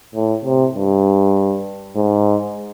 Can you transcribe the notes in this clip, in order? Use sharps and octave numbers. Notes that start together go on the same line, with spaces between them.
A2
C3
G2
G#2